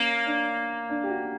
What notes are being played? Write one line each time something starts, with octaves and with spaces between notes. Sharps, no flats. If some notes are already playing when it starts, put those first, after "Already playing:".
Already playing: A#3 C#4
D4
D4
G4
F#4